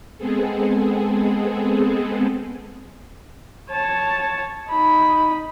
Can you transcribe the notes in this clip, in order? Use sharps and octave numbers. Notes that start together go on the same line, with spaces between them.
G#3 B3 C4 G#4 A4
C#5 A5
D#4 B5